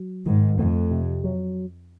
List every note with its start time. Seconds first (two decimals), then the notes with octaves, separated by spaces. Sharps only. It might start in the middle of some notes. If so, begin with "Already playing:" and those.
Already playing: F#3
0.25 G#2 D#3
0.58 F2 A3
0.91 C3
1.24 F#3